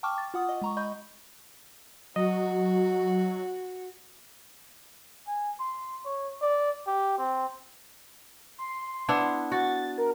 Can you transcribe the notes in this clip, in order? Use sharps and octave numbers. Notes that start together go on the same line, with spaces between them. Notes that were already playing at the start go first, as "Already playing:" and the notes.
G5 A5 C#6 D6 F6
D6 A6
F4 F#5 D#6
D#5
G#3 A#5 C#6
D#5 B5 C#6 G6
F#3 F#4 D#5
G#5
C6
C#5
D5
G4
C4
C6
B3 D4 E4
F#4 A6
A#4